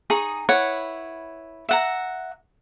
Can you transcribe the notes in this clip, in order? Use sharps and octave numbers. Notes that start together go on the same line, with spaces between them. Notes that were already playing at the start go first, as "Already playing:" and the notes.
D#4 G#4 C#6
E4 B4 C#5 F#5
E5 F#5 A#5